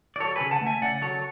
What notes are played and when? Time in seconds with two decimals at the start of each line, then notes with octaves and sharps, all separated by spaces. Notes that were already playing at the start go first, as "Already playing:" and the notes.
0.16 D5
0.20 F#3 A4 C#5
0.36 C#3 G#4 B4
0.51 F#5 A5
0.61 A3
0.66 E5 G#5
0.82 C#3 D5 F#5
1.02 F#3 A4 C#5